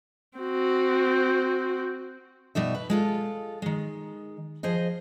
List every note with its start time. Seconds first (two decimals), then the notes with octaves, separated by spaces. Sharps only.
0.38 C4 F#4
2.55 B2 G3 D#4 E5
2.75 B4
2.90 G#3 F4 A4
3.62 D#3 G#3
4.63 F3 G#4 C5 D#5